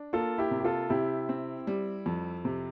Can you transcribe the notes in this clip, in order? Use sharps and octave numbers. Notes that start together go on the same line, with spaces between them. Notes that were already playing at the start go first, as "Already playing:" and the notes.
Already playing: D4
A#3 F4 A4
E4 G4
C3
G4
F4 A4
C3 E4 G4
C4
G3
F2
C3